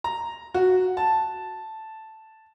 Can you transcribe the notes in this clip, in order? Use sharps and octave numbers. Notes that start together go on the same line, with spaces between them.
A#5
F#4
A5